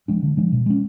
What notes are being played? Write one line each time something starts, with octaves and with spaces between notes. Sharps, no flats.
F3 G#3 D4
D3
F3 G#3 D4
B2
G#3 C#4